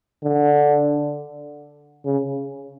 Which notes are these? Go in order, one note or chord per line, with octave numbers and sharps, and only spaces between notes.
D3
C#3